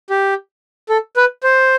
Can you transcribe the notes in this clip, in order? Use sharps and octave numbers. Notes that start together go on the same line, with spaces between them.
G4
A4
B4
C5